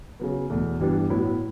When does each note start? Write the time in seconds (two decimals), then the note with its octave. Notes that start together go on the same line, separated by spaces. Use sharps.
0.20 C#3 F#3 B3
0.50 E2 B2 F#3 A3
0.79 G2 E3 G3 B3 D4
1.10 A2 F#3 B3 E4